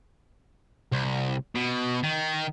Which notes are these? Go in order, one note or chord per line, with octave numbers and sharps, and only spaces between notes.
C2
B2
D#3